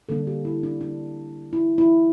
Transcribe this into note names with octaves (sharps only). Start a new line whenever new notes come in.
D3 G3 A#3 D4 A4
G4
E4
D4
D4
E4
E4